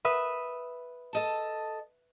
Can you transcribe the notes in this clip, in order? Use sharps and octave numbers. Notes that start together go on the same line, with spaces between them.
B4 E5 D#6
A4 D#5 A5